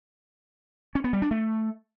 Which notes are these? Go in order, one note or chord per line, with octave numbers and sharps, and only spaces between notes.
C#4
B3
G3
D4
A3